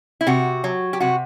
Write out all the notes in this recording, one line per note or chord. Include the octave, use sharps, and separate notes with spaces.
E4
C3 F#4
F#3
G4
C3 F#4